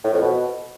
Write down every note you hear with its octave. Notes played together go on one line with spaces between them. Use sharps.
A2
F2
B2